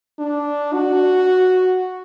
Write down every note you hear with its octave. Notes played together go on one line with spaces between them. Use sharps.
D4
F#4